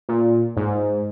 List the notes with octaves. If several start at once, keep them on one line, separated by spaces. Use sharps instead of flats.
A#2
G#2